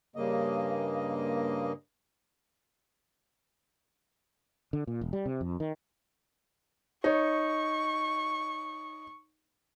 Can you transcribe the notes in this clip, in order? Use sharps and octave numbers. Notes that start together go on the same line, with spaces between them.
G2 C#3 A#3 D#5
D3
A#2
E1
G3
C3
F2
D#3
D#4 C#5 C#6